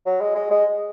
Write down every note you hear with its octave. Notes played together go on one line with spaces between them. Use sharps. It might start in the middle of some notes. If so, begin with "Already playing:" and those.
F#3
G#3
G#3
G#3